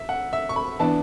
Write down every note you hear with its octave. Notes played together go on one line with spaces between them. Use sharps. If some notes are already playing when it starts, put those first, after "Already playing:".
Already playing: E5
F#5
E5
C#6
B5
E3 B3 D4 A5